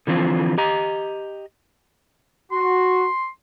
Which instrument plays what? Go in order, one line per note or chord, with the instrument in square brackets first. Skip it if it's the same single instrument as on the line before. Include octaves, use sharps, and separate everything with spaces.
[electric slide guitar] D3 E3 F3 C4 F4
G4 D#5 A#5
[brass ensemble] F#4 [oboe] C6